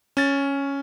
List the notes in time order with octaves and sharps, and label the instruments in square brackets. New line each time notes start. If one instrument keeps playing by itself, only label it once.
[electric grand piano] C#4 A6